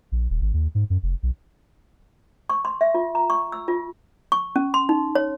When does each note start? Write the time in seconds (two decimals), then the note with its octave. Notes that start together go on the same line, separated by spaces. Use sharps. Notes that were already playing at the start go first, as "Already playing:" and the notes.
0.12 A#1
0.30 D#1
0.41 G#1
0.53 D#2
0.75 G#2
0.90 F#2
1.03 F1
1.23 B1
2.49 C#6
2.65 C6
2.81 E5
2.94 F4
3.15 A#5
3.30 C#6
3.52 E6
3.68 F4
4.32 C#6
4.56 C#4
4.74 C6
4.89 D#4
5.15 C#5